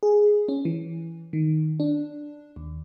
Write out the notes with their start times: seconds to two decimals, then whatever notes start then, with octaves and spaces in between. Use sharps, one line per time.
0.03 G#4
0.48 C#4
0.65 E3
1.33 D#3
1.80 D4
2.56 D#2